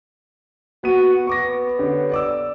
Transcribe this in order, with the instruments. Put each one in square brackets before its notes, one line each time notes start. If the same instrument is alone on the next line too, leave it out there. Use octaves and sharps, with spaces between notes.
[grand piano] B3 D#7 [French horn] F#4
[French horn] B3 [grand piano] C#6 D6 A#6
[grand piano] D3 G4 C#5
D5 D6 E6